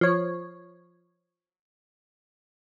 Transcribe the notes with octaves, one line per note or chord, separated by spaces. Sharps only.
F3 C#5